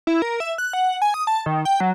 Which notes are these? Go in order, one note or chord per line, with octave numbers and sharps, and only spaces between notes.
E4
A#4
E5
F#6
F#5
G#5
D#6
A5
D#3
G5
F#3